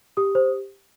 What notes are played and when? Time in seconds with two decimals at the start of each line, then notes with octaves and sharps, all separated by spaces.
0.17 G4 D#6
0.35 C5